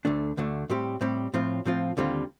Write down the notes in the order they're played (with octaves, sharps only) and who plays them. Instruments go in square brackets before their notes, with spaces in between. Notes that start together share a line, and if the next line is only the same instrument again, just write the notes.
[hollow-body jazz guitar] D2 D3 A3 D4
D2 D3 A3 D4
A2 G3 C4 G4
A2 G3 C4 G4
A2 F3 C4 F4
A2 F3 C4 F4
D#2 D3 G3 C4 F4